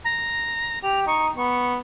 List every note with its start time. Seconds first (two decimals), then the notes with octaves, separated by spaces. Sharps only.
0.04 A#5
0.83 G4 F7
1.07 D#4 C#6
1.36 B3 C#6